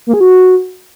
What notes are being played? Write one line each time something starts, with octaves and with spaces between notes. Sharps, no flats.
A#3
G#4
F#4